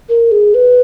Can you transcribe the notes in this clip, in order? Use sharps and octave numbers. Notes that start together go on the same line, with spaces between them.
A#4
G#4
B4